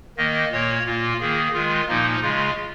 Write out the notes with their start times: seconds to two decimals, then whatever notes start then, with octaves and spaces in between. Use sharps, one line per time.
0.17 D#3 A#3 D#5
0.52 A#2 A#3 C#5
0.86 A#2 A#3 F4
1.20 D#3 A#3 G#4
1.54 D#3 G#3 F4
1.88 A#2 F3 A#3 D#4
2.23 C#3 G#3 F4